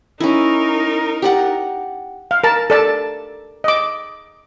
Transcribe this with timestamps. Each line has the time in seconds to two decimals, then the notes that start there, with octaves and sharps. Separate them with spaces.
0.20 C#4 D#4 E4 A#4
1.22 G4 D5 F#5
2.31 F5
2.44 A#4 A5
2.70 A4 D5 A5
3.64 D#5 D6